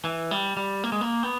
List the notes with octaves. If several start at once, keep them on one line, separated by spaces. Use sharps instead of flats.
E3
G3
G3
A#3
G#3
A#3
B3